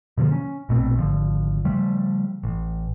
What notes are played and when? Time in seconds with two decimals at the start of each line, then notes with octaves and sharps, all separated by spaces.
0.17 B2 D3 F3 A#3
0.31 C#4
0.69 A#1 B2 A3 C4
0.98 G#1 D3 F3
1.65 C#3 F3 G3 A3
2.43 A1